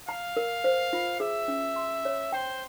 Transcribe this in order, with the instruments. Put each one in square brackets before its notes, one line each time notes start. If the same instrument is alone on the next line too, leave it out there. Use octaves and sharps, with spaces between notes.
[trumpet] F5 [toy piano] A#5
[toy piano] A#4
C5
F4
[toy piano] G#4 [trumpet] E5
[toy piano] C#4
C6
C#5
[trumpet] C5 [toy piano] G5